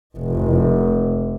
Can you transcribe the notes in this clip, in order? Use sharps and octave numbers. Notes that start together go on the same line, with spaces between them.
F1